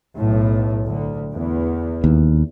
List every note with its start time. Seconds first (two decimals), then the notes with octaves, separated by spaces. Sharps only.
0.16 B1 A2
0.86 D2
1.33 E2
2.04 D#2